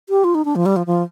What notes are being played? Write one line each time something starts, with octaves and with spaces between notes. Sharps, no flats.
G4
F4
D#4
D4
F3
G3
F3
F3